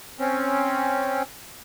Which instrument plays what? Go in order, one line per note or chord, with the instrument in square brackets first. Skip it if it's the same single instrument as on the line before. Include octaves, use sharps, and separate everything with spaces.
[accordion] C4 C#4